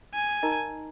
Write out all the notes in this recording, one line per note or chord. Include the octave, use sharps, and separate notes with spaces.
G#5
D#4 A#4 D#5 A#5